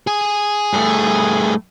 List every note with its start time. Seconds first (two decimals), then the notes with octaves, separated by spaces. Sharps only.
0.07 G#4 G#5
0.73 G2 A3